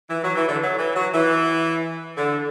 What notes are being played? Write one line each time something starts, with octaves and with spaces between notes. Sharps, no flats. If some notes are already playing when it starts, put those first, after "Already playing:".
E3
F#3
E3
D3
F#3
E3
F#3
E3
D3